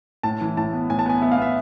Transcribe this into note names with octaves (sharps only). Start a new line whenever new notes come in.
A2 A5
E3
A2 A5
B3
A2 G#5
A5
B3 G#5
B3 E5
F5
B3 E5